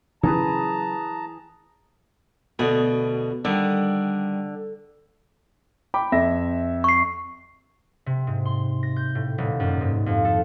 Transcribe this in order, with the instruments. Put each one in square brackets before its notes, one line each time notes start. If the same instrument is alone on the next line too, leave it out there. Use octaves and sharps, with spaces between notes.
[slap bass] C#3 F#3 C#4 [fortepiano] E3 [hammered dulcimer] G#4 B4 [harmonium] A5 A#5
[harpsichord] D2 F#4 G#4 [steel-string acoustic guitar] B2
[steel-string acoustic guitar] D3 [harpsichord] D#3 G3
[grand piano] G5 B5 D6
F2 E5 A#6
[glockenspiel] C#6 C7
[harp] C3
G#2
C6
A#6
G6
A2
D#1
F#2
G#2
F2
A4